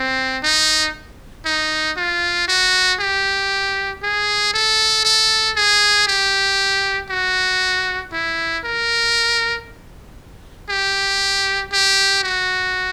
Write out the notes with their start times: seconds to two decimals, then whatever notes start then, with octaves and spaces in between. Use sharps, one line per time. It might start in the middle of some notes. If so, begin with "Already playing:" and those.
Already playing: C4
0.43 D#4
1.45 D#4
1.97 F4
2.48 F#4
3.00 G4
4.02 G#4
4.53 A4
5.05 A4
5.56 G#4
6.07 G4
7.10 F#4
8.12 E4
8.64 A#4
10.69 G4
11.73 G4
12.23 F#4